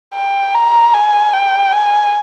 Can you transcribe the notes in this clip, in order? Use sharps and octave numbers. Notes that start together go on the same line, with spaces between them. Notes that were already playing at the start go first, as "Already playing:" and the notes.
G5
A#5
G#5
G5
G#5